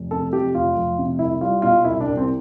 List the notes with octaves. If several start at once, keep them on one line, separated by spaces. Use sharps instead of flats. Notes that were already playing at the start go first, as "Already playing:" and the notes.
Already playing: F1
C3 A4
F2 G4
F1 F4
F1
C3
C2 E4
G3 F4
B2 F4
C2 E4
D4
C2
C4